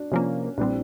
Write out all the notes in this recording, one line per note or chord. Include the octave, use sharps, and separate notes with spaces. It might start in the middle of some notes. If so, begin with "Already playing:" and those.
Already playing: D4 F#4
C3 F3 A#3 C#4
A#1 E3 G3 C4 D4